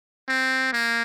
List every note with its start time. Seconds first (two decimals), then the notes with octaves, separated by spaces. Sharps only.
0.28 C4
0.73 A#3